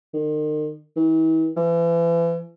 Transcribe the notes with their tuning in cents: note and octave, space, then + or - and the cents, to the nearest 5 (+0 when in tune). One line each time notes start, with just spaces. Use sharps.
D#3 -40
E3 -40
E3 +35